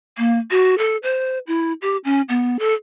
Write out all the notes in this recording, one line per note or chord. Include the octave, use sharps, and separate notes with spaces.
A#3
F#4
A4
C5
E4
G4
C#4
B3
A4